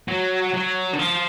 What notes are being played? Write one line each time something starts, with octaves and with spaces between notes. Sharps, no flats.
F#3
F#3
D3
F3